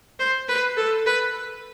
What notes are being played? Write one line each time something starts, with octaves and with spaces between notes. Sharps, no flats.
C5
B4
A4
B4